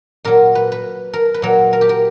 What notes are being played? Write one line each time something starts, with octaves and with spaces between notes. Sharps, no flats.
A#2 F#3 A#4
B4
B4
A#4
B4
A#2 F#3 A#4
A#4
G4
A#4